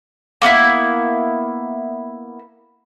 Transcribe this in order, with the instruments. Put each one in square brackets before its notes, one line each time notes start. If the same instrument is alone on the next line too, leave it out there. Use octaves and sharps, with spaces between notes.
[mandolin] A#3 B3 D#4 E4